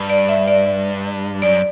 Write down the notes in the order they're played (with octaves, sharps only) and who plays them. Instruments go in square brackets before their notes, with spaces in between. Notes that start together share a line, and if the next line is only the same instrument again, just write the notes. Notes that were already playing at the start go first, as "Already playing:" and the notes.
Already playing: [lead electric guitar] G2
[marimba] D5
E5
D5
[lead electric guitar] F#2 [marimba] D5